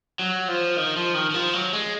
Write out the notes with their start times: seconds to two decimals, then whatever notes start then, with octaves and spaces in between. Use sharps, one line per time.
0.19 F#3
0.48 F3
0.77 D#3
0.96 F3
1.15 D#3
1.30 D#3
1.34 F3
1.53 F#3
1.73 G#3